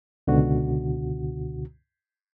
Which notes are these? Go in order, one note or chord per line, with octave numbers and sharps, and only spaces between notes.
C#2 B2 D3 F#4